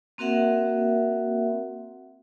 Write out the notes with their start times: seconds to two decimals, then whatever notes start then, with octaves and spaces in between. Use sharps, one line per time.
0.18 A#3 C4 F#4 A#4 E5 F#5